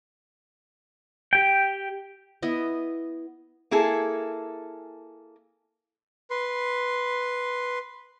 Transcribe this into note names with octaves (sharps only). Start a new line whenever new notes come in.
G4 G5
B3 E4 D#5
A#3 E4 G#4 A4
B4 C6